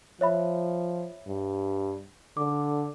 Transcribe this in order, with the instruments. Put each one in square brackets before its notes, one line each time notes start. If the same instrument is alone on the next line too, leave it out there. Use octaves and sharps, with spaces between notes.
[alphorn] F3 [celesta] C#5 E5 B5
[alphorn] G2
[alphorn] D3 [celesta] D6